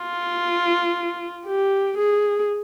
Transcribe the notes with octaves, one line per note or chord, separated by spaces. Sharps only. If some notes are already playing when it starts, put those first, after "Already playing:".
Already playing: F4
G4
G#4